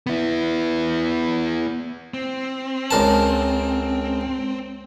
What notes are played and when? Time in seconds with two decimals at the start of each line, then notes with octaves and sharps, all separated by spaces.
0.07 B3 E4
2.14 C4
2.91 C#2 A#4 A5